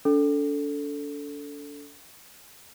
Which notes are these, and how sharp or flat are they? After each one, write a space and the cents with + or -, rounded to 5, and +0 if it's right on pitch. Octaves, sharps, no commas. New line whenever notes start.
D4 -40 A4 +0